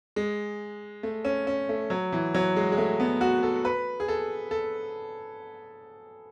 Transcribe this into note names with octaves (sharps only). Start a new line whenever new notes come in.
G#3
A3
C#4
C#4
A3
F#3
E3
F#3
G#3
G#3
A3
B3
F#4
A4
B4
G#4
A4
A4